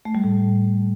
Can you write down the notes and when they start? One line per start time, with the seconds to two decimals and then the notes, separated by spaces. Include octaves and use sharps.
0.05 A3
0.15 G3
0.24 A2